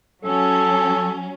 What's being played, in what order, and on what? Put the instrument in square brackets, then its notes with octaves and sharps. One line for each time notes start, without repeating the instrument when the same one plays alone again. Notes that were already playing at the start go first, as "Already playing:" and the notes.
[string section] F#3 C#4 [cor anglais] A4